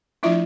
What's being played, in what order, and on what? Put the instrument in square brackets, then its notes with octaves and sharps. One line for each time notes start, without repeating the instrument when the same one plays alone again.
[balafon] F3 A3 D4 E4 F4 E5